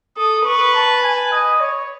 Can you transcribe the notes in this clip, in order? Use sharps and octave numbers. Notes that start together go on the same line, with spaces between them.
A4 D#6
B4 C#6
A5
G#5
D#5
C#5